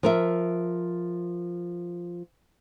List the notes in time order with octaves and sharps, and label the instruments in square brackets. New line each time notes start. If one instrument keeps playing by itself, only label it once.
[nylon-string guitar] F3 A#4 E5